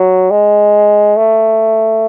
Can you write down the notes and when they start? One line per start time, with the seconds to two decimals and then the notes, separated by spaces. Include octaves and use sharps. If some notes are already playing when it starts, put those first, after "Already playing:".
Already playing: F#3
0.31 G#3
1.17 A3